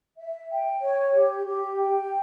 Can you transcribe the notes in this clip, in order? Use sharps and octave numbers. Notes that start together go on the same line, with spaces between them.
E5
G5
C#5
G4
G4
G5